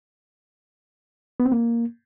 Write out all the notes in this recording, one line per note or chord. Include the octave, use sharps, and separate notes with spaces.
B3
C4
A#3